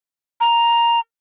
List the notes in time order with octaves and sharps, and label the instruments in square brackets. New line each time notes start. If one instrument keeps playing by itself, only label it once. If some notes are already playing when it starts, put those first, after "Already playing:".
[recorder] A#5